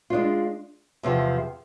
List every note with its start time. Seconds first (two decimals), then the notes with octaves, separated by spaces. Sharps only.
0.10 G#3 D4 F4
1.03 E2 C3 F3